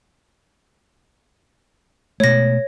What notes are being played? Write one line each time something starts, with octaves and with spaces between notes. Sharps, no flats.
B2 G#3 A3 C#5 A#6